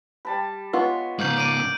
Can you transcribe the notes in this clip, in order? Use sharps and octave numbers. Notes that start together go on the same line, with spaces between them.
G3 A5 B5
G#3 B3 F4 C#5
G#2 C#3 A#3 G6 F#7
D5 D7 D#7